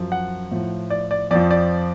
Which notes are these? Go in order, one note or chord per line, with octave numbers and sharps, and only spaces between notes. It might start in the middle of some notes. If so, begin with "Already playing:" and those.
Already playing: F#2 F3
F#5
A2 F3
D5
D5
F2 F3 D5
D5